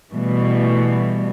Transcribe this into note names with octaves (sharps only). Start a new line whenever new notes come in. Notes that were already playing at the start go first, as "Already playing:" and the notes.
B2 E3 G3 A3